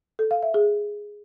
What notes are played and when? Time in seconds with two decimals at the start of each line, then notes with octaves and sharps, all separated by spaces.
0.19 A4
0.31 F5
0.43 E5
0.54 G#4